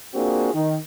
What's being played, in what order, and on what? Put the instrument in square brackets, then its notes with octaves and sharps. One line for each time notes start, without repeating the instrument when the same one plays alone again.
[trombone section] A#3 C4 D4 F4 F#4 G#4
D#3